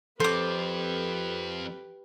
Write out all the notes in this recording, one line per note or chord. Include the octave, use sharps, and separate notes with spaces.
F3 C4 G4 A4 B4 C5 D6